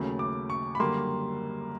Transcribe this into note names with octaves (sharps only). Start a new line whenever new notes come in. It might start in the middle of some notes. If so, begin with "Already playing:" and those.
Already playing: D#2 C#3 F#3 A3
D6
C#6
B5
F#2 D3 G3 A#3 C6